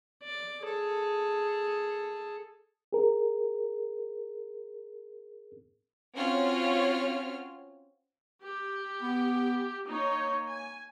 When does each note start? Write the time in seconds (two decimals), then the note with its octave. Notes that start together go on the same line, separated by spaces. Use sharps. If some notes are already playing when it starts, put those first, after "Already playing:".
0.24 D5
0.62 G#4 A4
2.93 G#4 A#4
6.16 C4 C#4 F4 F#4 C#5 F6
8.43 G4
9.02 B3
9.89 A#3 D#4 C#5
10.49 G#5